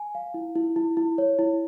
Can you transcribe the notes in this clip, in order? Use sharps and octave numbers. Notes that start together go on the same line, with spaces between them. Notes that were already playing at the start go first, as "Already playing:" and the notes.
Already playing: G#5
F5
E4
E4
E4
E4
C#5
E4